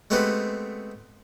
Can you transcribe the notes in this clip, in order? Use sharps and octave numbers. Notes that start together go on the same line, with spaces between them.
G#3 A3 B3 C4 G4 B4